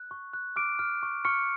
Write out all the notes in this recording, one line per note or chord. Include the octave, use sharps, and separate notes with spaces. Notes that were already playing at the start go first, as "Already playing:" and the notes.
Already playing: F#6
C#6
F#6
D6 F6 D7
F6
C#6
C#6 F6 C#7